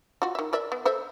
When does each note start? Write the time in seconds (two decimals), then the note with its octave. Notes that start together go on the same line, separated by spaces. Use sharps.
0.22 F4 F#4
0.35 D#3 E5
0.53 A#4 D5 E5
0.72 B3
0.85 A4 C5 E5